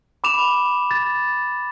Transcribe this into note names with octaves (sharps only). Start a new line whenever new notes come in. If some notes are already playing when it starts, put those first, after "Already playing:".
B5 D6 E7 F7
A6